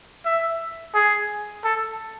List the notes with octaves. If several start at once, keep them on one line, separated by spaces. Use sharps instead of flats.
E5
G#4
A4